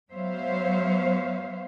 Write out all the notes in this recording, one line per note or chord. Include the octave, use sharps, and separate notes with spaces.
F#3 B3 C5 C#5 E5 F5